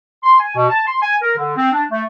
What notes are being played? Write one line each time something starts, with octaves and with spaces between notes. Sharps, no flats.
C6
G#5
B2
A5
C6
G#5
A#4
D3
C4
D4
A3